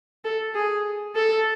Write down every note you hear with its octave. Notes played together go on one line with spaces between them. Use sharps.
A4
G#4
A4